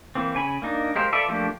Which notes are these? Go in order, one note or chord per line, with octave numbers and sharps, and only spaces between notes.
E3 A#3 C4
C#3 G#5 B5
A#3 D4 D#4
G#3 G4 A#4 C5 F5
F4 A4 B4 D5 E5
F3 A3 A#3 D4 G4